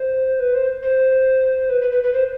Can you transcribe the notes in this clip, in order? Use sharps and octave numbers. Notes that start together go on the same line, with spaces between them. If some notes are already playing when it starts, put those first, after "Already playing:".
Already playing: C5
B4
C5
C5
B4
B4
B4
B4
C5